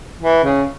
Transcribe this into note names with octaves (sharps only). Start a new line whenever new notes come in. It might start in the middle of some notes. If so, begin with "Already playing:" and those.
E3
C#3